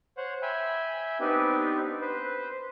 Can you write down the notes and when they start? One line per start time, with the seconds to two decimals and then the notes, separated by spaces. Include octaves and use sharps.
0.17 C5 C#5 F#5
0.42 E5 G5 G#5 B5
1.20 B3 C4 D4 D#4 G4 B4
2.01 B4 C5